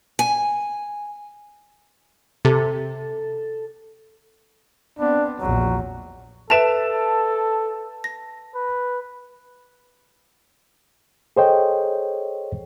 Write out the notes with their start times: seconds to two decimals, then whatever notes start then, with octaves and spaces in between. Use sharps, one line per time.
0.19 G#5
2.45 C3 A4
4.99 B3 C4 D4
5.40 A#1 E2 F#3
6.50 A4 B4 E5 A5 D7 E7 F7
8.04 A#6
8.55 B4
11.37 G#4 A4 C5 C#5 D#5 G5